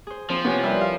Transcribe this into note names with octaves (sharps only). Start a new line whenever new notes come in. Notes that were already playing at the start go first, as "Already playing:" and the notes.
G#4 C5
F3 C4
C3 B3 C#5 G#5
G3 E4 A#4 B4 E5
F5